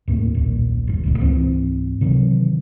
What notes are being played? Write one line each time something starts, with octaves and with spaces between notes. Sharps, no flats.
D#2 A2 A#3
D#1 B1 A#2
F#1 D#2
F1 C#2 A#2
C#2 G#2 E3 C4
C3 D#3 E3 F#3